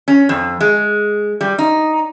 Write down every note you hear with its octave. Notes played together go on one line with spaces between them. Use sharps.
C#4
F2
G#3
G3
D#4